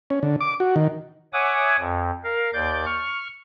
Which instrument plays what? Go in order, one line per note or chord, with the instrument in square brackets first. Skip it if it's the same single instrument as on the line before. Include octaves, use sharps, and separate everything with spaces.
[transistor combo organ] C#4
D3
D6
F#4
D#3
[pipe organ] C#5 E5 F#5 G#5 D6 D#6
F2
A#4 F5
D#2 D5 D6 G6
C#6 F6